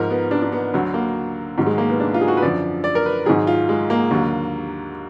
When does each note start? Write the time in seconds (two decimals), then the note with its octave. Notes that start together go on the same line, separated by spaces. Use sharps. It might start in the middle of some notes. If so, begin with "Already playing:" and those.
Already playing: G#2 F3 A#4
0.10 B3
0.31 D4
0.42 D4
0.52 B3
0.74 D2 D3 F#3
0.94 A#3
1.58 G#2 D#3 F#3
1.66 G#3
1.78 A#3
1.89 B3
2.00 D4
2.14 F4
2.21 G#4
2.28 F#4
2.37 B4
2.42 F#2 D3 F3 D5
2.84 D5
2.95 A#4
3.06 B4
3.26 G#2 D#3 F#3 G#4
3.47 F4
3.69 G#3
3.90 A#3
4.11 D#2 D3 F#3